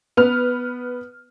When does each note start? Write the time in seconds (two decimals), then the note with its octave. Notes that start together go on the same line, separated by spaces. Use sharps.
0.17 B3 B4 F6